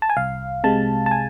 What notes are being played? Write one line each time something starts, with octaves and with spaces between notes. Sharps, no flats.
A5
G#5
C2 F5
C3 G#3 A5
A5
G#5